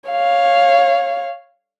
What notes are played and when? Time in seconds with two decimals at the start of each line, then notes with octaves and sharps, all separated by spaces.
0.10 C#5 F5